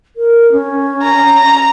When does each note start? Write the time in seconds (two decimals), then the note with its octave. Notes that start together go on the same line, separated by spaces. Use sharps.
0.16 A#4
0.52 C#4
1.03 A#5
1.41 A#5